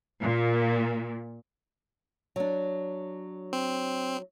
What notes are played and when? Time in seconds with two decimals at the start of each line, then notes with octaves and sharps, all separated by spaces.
0.22 A#2
2.36 F#3 D4
3.53 C4